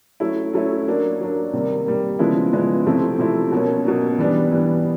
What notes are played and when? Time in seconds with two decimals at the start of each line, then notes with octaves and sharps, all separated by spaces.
0.20 F#3 A3 C#4 E4
0.53 F#3 A3 C#4 E4
0.87 F#3 A#3 D4
1.20 F#3 A#3 D4
1.53 C3 D#3 G3 A#3
1.86 C3 D#3 G3 A#3
2.19 C#3 F3 G#3 B3 E4
2.53 C#3 F3 G#3 B3 E4
2.86 C3 F3 A3 C4 E4
3.19 C3 F3 A3 C4 E4
3.52 B2 F#3 A#3 C#4
3.85 B2 F#3 A#3 C#4
4.18 E3 G3 B3 D4
4.51 E3 G3 B3 D4